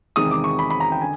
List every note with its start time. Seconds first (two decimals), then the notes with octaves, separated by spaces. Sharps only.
0.16 E2 C3 D#3 G#3 D#6
0.31 D6
0.44 C#6
0.59 B5
0.70 B5
0.80 A#5
0.92 G5
1.01 D3 G#5